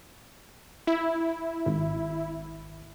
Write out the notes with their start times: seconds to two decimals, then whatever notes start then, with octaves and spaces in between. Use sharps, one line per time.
0.87 E4
1.66 G#1